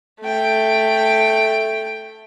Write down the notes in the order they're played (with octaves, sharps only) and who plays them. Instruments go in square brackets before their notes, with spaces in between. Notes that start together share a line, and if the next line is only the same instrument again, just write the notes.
[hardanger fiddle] A3 G5